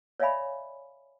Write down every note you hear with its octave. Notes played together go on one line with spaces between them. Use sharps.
C#5 D5 E5 F5 G#5 B5